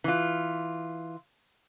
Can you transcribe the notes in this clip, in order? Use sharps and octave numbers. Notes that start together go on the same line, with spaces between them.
E3 F4